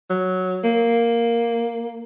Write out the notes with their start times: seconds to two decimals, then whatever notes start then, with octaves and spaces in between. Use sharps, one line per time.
0.10 F#3
0.64 A#3